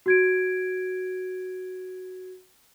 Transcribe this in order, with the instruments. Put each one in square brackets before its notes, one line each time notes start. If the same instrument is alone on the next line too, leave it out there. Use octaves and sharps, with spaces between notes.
[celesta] F#4 G#6 D7